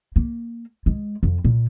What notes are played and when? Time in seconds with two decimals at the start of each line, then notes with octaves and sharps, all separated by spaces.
0.16 A#3
0.86 G#3
1.23 F2
1.44 A#2